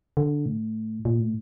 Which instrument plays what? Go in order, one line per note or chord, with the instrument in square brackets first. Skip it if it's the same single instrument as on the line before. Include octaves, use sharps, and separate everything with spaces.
[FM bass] D3
A2
A#2
A2